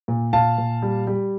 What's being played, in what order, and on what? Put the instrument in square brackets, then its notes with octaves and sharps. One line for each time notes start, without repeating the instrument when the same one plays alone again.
[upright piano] A#2
A#2 F5 A5
A#2
G3
G3